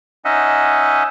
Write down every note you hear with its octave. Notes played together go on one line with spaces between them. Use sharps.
C#4 D#4 D#5 E5 F#5